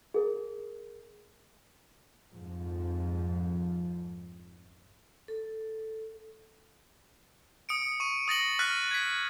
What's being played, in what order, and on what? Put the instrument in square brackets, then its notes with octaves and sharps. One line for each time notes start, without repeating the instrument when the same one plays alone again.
[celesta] G#4 A#4
[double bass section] F2 G#2 F3
[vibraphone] A4
[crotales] D#6 C#7 D7
C#6 D#7
D#6 A6 A#6 F#7
F6 F#6 A6 B6 D#7
G#6 B6